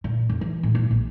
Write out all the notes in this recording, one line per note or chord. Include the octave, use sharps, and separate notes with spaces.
A#2
F1
E3
A2
A#2
A#1